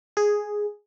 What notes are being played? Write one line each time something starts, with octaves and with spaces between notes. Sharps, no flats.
G#4